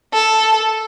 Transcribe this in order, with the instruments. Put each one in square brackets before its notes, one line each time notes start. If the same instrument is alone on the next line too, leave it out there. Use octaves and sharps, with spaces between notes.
[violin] A4